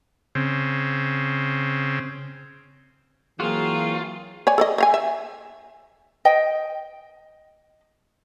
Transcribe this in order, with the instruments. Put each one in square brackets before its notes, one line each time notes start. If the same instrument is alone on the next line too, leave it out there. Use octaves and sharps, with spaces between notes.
[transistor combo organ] C#3 C4
[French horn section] E3 F#3 A#3 [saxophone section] C4 G#4 [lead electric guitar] F4 [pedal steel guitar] F#4 A#4
[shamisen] C#5 D5 G#5
A4 D5 D#5
D#5 F5 G#5
E5
[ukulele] D#5 G5